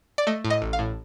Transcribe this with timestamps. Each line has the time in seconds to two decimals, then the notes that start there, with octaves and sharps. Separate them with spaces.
0.18 D5
0.27 A3 D#5
0.45 A2
0.50 D#5
0.62 A1
0.73 F5
0.79 A2